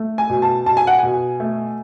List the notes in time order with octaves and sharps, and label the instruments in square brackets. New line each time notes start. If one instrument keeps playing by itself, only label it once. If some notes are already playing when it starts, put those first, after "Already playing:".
Already playing: [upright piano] A3
G#5
B2
A5
B2 A5
G#5
F#5
B2 G#5
A3